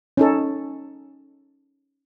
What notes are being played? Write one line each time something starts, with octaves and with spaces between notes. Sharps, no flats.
C#4 D#4 A4